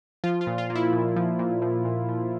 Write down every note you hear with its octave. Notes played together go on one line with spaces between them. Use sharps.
F3 F4
F4
A#2
F4
A#3
E4
A#2
F3
A#2
F3
A#2
F3